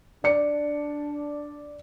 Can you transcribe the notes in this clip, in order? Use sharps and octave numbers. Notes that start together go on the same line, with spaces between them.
D4 D5 C#7